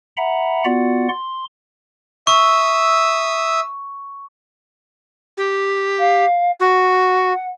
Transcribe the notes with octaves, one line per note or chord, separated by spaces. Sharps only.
E5 F#5 A#5 B5
B3 F4 F#4 D5 F#5
C6
E5 C#6 D#6 E6
G4
F5
F#4 F#5